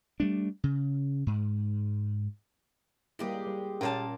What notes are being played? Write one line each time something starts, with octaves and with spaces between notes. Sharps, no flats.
G3 A3 D4
C#3
G#2
G3 G#3 A#3 E4 G4 G#4
G3
A#2 C#4 A#4 C#5 F5 A5